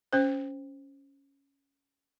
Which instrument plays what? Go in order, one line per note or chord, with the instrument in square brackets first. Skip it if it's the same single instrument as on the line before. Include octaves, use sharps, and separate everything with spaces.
[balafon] C#4 C5